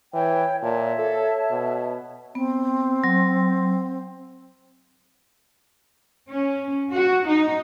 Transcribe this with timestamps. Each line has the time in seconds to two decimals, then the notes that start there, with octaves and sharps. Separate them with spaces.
0.13 E3 C#5 G5
0.63 A#2 C#5 E5 A5
0.99 A4
1.51 B2
2.35 B3 C4
3.04 F#3
6.30 C#4
6.91 F#4
7.26 D#4